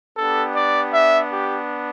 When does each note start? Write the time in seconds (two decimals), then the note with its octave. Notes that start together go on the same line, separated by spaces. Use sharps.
0.17 B3 D4 G4 A4
0.55 D5
0.93 E5
1.31 G4